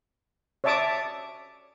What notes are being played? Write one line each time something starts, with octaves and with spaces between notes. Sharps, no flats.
C#5 D5 E5 A5 D6 D#6